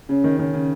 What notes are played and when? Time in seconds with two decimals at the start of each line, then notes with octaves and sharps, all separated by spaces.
0.09 C#3 C#4
0.24 D#3
0.39 D#3 C#4
0.53 C#3